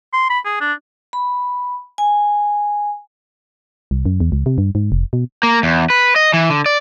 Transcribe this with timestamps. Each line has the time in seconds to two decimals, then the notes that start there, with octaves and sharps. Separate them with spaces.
0.13 C6
0.30 B5
0.45 G#4
0.61 D4
1.13 B5
1.98 G#5
3.91 C2
4.06 F#2
4.20 E2
4.32 C#2
4.46 C3
4.58 G2
4.75 G#2
4.92 F1
5.13 B2
5.43 A#3
5.63 E2
5.90 B4
6.16 D#5
6.33 E3
6.50 D3
6.66 D5